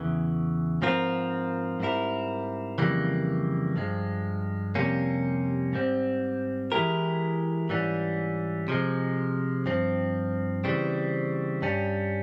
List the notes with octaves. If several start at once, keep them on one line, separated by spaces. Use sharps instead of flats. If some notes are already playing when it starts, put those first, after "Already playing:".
Already playing: E2 C#3 E3
G#2 F3 C4 F4 A#4
G#2 G3 C4 E4 A#4
F2 C#3 E3 G3 A#3
G2 F3 G#3
F2 C3 G3 A#3 C#4
G#2 G3 C4
E3 G#3 E4 G4 A#4
G#2 E3 G3 C#4
C3 F3 G#3
G2 F3 C4
C#3 E3 G3 C4
G2 G3 C#4